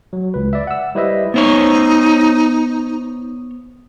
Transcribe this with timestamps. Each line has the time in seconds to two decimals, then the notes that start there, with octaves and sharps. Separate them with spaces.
0.13 F#3
0.34 C#2 B4
0.53 D5 E5
0.67 F#5 E6
0.95 G3 E4 B4 C5 D#5 E5
1.34 B3 D#4 C5 C#5